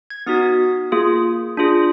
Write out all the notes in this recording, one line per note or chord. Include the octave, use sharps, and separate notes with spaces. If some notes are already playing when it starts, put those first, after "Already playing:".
G#6
B3 D#4 F#4 D#6
A#3 F4 G#4
D4 F4 G#4